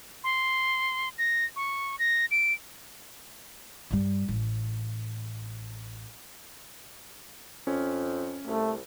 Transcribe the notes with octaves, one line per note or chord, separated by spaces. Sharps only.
C6
A#6
C#6
A#6
D7
G2 G3
A1
F2 C#4
C2 A3